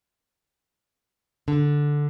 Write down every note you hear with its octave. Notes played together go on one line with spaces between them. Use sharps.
D3